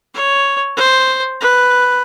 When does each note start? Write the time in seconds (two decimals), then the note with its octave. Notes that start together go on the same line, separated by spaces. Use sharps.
0.14 C#5
0.77 C5
1.41 B4